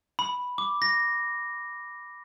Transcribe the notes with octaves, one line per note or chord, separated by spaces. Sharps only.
B5
D6
A#6